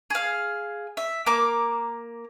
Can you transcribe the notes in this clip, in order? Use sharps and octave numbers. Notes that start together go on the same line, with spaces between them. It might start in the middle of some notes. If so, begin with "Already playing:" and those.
G#4 F5
E5
A#3 A#5 D6